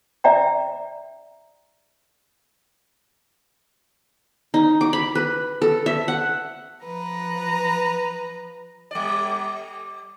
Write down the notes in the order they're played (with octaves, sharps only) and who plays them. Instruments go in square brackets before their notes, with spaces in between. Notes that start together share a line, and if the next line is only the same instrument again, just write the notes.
[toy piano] D5 E5 G5 A#5
[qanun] D#4
D6
B5
B4
A4
E5
F#5
[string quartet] F3 B4 A#5
[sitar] G3 D5